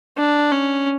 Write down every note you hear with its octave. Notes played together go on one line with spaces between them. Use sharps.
D4
C#4